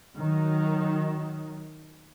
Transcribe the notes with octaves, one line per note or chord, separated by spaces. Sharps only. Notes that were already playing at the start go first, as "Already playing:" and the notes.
D#3 F#3